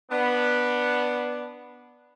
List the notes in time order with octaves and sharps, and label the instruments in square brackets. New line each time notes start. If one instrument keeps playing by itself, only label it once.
[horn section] B3 D4